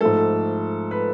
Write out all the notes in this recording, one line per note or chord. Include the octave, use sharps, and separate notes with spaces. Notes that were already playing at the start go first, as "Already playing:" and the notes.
G#2 F3 A3 A4
B4